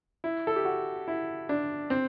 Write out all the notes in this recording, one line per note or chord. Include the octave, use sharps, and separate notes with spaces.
E4
A4
G4
F#4
E4
D4
C4